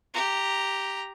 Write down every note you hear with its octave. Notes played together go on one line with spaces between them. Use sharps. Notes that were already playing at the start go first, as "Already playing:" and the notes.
G4 A#5